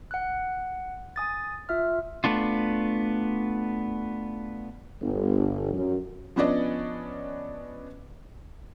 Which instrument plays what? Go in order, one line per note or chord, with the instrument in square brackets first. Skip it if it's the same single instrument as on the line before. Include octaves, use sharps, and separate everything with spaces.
[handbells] F#5 F#6
G#5 D#6 A6
F4 E5 F6
[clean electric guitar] A3 B3 D4 F4
[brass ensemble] G1
F#2
[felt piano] F3 B3 C#4 D4 D5 D#5